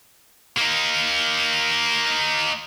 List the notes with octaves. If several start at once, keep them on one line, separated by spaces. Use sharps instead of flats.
A#3 D#4